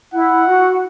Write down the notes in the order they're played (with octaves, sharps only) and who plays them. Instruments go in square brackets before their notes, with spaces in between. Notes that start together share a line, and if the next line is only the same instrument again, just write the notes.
[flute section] E4 [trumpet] F#5
[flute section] F#4